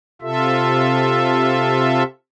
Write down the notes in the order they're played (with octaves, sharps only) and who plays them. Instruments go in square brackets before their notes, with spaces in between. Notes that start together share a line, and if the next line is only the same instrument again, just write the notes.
[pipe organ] C3 F4 A4 E5